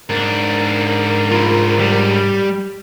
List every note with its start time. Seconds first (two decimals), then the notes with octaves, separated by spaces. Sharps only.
0.10 G#2 D4 A#4
1.31 F4 B5
1.79 G3